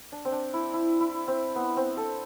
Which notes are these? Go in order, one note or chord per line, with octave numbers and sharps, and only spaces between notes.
D4
C4
D4
E4
E4
E4
C4
B3
C4
A4